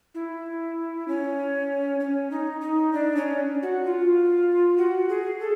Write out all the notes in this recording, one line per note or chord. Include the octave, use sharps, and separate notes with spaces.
E4
C#4
C#4
D#4
D#4
D4
C#4
F#4
F4
F#4
G#4
A4